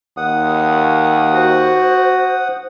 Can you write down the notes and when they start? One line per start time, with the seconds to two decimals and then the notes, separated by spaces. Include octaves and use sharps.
0.17 D#2 F#5 D#6
1.33 F#4 C5